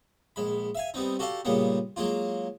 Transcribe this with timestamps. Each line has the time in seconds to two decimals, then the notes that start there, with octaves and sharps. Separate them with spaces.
0.36 A#1 G#3 B5
0.75 E5 F5 G#5
0.94 G3 B3 C4 D#4
1.19 F#4 G4 A4 D5 F5
1.45 A#2 C#3 G3 G#3 A#3 B3
1.96 F#3 G#3 A#3 F4